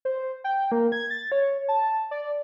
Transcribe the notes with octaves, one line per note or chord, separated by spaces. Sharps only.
C5
G5
A#3
G#6
A6
C#5
A5
D5